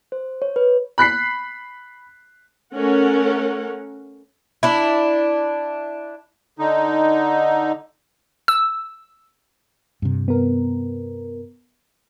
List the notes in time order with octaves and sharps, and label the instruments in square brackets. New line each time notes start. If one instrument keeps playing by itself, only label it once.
[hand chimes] C5
C#5
B4
[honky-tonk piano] B5 F#6 B6 C7
[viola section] A3 C#4 A#4 F#5
[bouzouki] D4 E4
[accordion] D3 D#4
[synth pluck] E6
[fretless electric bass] G2 C3
[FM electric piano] B3 A#4